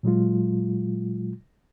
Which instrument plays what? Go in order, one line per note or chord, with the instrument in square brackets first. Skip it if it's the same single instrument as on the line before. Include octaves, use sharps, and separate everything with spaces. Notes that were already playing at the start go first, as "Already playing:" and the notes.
[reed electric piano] A#2 F#3 G#3 F4